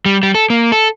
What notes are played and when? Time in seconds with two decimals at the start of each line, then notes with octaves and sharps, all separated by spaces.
0.06 G3
0.23 G3
0.35 A4
0.50 A#3
0.72 A4